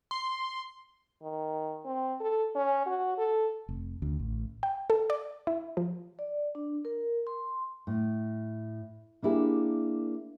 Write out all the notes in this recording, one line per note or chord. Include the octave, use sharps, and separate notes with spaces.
C6
D#3
C4
A4
C#4
F#4
A4
F1
D2
A1
G5
A4
D5
E4
F3
D5
D4
A#4
C6
A2
A#3 D4 E4 G4 G#4